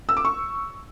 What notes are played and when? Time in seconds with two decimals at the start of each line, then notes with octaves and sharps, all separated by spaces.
0.09 E6
0.17 D6
0.25 C#6